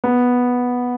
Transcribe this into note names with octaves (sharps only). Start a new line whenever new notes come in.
B3